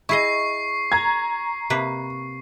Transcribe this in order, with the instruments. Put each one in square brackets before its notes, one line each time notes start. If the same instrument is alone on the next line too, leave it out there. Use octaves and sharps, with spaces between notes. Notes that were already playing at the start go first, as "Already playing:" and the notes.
[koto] E4 G#4 D#5 [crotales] C#6 C7
[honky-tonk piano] A#5 G#6
[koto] C3 A#3 B4